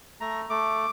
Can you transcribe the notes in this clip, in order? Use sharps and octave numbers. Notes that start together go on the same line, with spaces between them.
A3 A#5
A3 D6